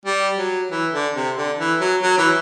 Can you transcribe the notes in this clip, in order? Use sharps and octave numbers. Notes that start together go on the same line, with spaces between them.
G3
F#3
E3
D3
C3
D3
E3
F#3
F#3
E3